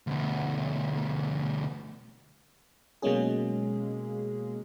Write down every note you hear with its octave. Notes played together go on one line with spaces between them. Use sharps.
D2 B2
B2 F#3 G#3 A#3 C#4 G#4